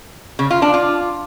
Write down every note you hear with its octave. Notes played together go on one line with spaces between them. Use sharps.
C#3
F4
D4
F4